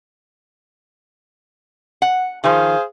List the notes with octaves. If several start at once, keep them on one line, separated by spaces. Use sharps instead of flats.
F#5
D#3 F3 G#4 C5 F5